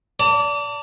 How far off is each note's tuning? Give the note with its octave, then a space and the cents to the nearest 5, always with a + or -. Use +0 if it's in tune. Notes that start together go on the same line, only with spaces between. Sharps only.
D5 -25 A5 +35